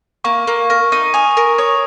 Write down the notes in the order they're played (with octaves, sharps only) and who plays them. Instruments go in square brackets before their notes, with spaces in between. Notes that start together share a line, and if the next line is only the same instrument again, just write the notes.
[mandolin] A#3 [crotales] C#6
[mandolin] A#3
A#4
D#4
[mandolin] G#5 [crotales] D#6
[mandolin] A#4
[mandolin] C#5 [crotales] D#6